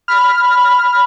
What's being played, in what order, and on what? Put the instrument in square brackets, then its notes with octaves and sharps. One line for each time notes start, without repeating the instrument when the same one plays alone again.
[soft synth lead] B5 [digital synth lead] F6